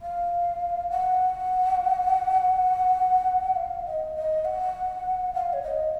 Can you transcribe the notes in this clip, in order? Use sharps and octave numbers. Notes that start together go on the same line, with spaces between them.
F5
F#5
F5
D#5
D#5
F#5
F5
C#5
D#5